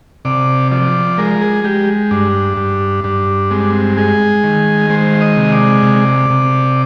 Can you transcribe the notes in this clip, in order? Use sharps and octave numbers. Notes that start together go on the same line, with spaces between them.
C3 D5
F3 D5
G#3 A#4
G#4
G#3 G4
G2 D4
G2
G2 D4
G#3 C4
D4
C4
G#3 G#4
D#3
G#3 C5
D#5
C3
D5
C3
C3